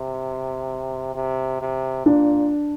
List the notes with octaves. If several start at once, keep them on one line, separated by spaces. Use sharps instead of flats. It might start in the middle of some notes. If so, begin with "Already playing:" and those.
Already playing: C3
C3
C3
A#2 D4